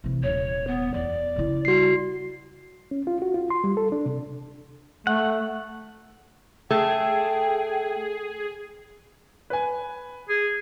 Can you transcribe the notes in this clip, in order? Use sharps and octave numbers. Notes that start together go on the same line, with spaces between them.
C3 E3
D#1 C#5
B3
E2 D5
C#3 E4
G3 F#4 C7
C#4
F4
F#4
F4
C6
G3
A4
D4
C3
A3 F#5
A3 G#4 G5
B4 G#5
G#4